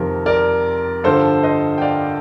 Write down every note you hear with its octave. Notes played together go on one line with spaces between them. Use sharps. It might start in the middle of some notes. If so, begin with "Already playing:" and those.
Already playing: F2 C3 D#3 A#4
A#4 D5
G2 D3 F3 A4 C5
C5 D#5
G5
D5 F5